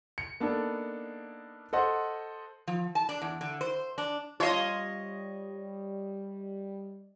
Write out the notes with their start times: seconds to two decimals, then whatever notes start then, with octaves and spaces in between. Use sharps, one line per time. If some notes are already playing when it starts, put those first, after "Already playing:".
0.18 C#7
0.40 A#3 B3 D4 D#4 A4
1.73 A4 C5 D#5 F#5 C6
2.67 F3
2.95 A5
3.09 D4
3.22 E2
3.41 D3
3.61 C5
3.98 D4
4.40 G3 F4 C#5 D#5 A5 C6